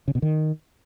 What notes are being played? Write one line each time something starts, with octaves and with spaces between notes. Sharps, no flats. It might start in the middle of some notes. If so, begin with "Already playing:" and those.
C#3
B2
D#3